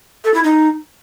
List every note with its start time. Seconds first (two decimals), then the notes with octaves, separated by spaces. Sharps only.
0.24 A4
0.34 E4
0.44 D#4